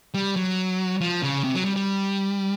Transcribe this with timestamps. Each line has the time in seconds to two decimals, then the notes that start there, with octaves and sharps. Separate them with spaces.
0.14 G3
0.36 F#3
1.01 F3
1.23 C#3
1.44 C3
1.55 F#3
1.65 G3
1.76 G3